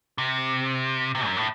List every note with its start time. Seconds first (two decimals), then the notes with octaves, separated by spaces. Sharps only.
0.18 C3
1.15 C3
1.26 F#2
1.36 A2